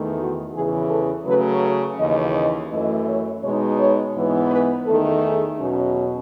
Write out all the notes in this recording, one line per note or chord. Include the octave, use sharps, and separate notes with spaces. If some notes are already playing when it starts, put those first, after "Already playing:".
Already playing: E2 D#3 A3
F#4
E2 C#3 E3 G#4
A4
C#3 F#3 A3 B4
C#5
D#2 C#3 E3 D#5
D#5
F#2 E3 A3 D#5
C#5
B2 G#3 D#4 C#5
C#5
G#2 E3 B3
B4
E2 D#3 A3 D#4 A4
G#4
E2 B2 F#3 C#4